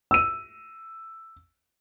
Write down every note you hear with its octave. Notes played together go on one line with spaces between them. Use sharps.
E6 D#7